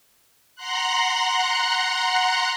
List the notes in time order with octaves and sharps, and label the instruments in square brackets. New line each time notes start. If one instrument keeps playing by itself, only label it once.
[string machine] F#5 A#5 C6 F#6